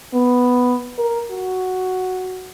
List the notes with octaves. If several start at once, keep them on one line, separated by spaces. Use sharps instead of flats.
B3
A#4
F#4